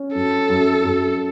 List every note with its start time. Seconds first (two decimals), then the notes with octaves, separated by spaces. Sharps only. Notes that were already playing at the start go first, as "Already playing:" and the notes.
Already playing: C#4
0.15 F#2 A4
0.50 F#2
0.85 F#2